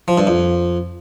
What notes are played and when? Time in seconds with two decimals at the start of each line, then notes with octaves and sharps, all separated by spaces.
0.08 F3
0.18 G2
0.27 F2